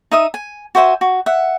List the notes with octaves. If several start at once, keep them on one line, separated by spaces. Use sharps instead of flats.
D#4 E5 D#6
G#5
F#4 C5 E5 G#5
F#4
E5 F#5